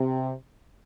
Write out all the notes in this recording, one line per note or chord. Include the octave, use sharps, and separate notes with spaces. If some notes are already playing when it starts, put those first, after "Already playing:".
Already playing: C3